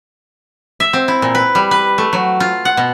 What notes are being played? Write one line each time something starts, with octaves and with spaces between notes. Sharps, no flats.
E5
C4
E4
A#2
B4
G3
B4
A3
F#3
F4
F#5
B2